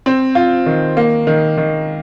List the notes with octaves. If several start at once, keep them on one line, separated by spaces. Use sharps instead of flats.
C4
F4
D#3
A#3
D#3
D#3